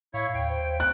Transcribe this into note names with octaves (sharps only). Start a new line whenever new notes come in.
A2 E4 C#5 F5
D#2 G5
C5
G5
F#6